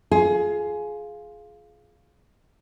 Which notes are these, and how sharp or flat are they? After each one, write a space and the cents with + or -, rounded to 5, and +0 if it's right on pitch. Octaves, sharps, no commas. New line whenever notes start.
F4 +0 G#4 +20